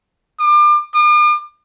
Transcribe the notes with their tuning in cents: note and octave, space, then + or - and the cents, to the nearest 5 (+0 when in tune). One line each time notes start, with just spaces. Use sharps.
D6 +35
D6 +45